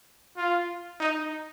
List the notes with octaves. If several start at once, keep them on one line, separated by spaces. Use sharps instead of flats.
F4
D#4